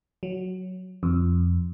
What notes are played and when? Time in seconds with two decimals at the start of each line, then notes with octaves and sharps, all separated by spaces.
0.23 F#3
1.03 F2